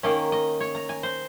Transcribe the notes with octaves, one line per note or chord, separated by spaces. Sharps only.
D#3 A#3 C#4 D#5
D#5
C#5
A#5
G#5
C5